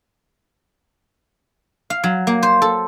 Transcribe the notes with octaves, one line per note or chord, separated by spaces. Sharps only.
F5
F#3
A#3
C5
A4